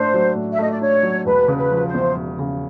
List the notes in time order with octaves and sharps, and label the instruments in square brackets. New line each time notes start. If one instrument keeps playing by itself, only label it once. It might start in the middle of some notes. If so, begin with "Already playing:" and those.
Already playing: [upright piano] A2 A3 D4 [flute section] C5
[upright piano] F#3
A2
[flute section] E5
[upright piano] A3 [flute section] D#5
[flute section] D5
[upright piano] D4 [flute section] C#5
[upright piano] F#3
[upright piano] E1 [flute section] B4
[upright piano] C#3
[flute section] B4
[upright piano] F3
[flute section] C5
[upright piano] E2
E1
C#3